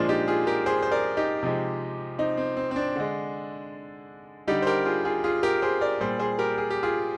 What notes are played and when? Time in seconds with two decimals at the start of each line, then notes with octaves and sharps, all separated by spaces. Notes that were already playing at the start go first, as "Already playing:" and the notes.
Already playing: A#2 F3 G#3 D4 F4
0.09 D#4 G4
0.28 F4 G#4
0.47 G4 A#4
0.66 G#4 C5
0.83 C5
0.92 A#4 D5
1.17 D#4 G4
1.43 C3 F3 G#3
2.19 C4 D#4
2.37 C4
2.57 C4
2.71 C4
2.76 D4
2.96 D3 G#3
4.47 D3 G3 D#4 G4
4.62 C5
4.67 G4 A#4
4.85 F4 G#4
5.05 F4 G#4
5.24 F4 G#4
5.43 G4 A#4
5.62 G#4 C5
5.81 A#4 D5
6.01 A#2 G3 G#4 C5
6.19 G#4 C5
6.39 G4 A#4
6.58 G#4
6.70 G4
6.83 F4 G#4